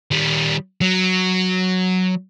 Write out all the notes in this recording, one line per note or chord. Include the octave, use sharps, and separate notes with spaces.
D#3 G3
F#3